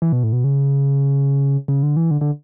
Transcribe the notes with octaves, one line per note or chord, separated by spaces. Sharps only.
E3
B2
A2
B2
C#3
C#3
D3
E3
D3
D3